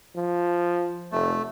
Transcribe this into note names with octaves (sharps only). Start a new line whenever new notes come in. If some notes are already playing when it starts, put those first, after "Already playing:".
F3
F1 A3